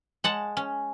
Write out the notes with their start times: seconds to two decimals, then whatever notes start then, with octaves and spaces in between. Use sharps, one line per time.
0.24 G#3 F#5 A5
0.57 C#4